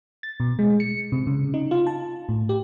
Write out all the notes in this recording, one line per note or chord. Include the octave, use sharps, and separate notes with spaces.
A6
B2
G#3
C#7
C3
C#3
D#4
F4
A5
A2
G4